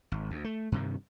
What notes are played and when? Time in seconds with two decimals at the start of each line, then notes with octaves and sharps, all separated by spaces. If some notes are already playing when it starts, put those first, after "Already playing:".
0.12 G#1
0.31 D2
0.44 A3
0.72 G2 C3 D#3